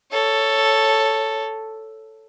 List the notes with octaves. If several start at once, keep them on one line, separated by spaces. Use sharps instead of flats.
A4 C#5